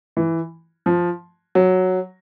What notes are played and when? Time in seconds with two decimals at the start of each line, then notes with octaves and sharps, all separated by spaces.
0.17 E3
0.86 F3
1.55 F#3